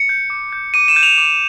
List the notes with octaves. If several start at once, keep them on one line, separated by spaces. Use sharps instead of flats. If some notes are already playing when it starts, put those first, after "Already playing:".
Already playing: C#7
G6
D6
G6
D6 D#7
E7
G6
F7
D6